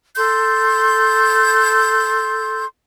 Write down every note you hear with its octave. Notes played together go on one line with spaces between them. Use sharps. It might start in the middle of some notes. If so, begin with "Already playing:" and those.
A4 C6 G6